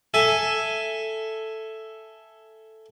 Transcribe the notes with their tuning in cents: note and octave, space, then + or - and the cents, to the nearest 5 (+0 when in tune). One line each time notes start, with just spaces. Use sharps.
A4 +0 E5 +5 G#5 +0